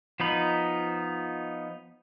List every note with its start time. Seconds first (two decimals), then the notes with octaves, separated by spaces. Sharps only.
0.20 F3 B3 D#4 B5